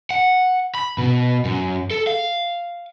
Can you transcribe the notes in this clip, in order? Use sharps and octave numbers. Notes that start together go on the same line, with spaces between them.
F#5
B5
B2
F#2
A4
F5